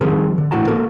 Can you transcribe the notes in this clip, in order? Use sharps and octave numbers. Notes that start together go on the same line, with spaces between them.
D#3 F3 G3 C4 G#4 A#4
D3
A2 D3 E3 F#4 A5 A#5
A#3 F#4 A4 A#4